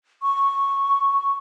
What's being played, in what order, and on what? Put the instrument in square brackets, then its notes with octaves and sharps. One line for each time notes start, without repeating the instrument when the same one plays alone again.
[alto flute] C#6